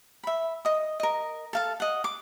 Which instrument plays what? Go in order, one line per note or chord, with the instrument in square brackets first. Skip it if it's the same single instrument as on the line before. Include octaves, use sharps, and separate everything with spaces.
[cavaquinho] E5 B5
D#5 D#6
A#4 D#5
A4 F5 A5
D#5 F#5
D6